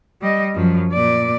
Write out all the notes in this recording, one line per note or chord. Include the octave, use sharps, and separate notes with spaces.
G3 D#5
F#2 F3
A#2 D5